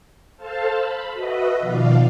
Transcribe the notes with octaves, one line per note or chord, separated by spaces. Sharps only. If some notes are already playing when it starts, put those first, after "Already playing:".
A4 C5 F5 A5
B5
F#4 B4 D#5 E5
B2 D#3 F3 D5 F5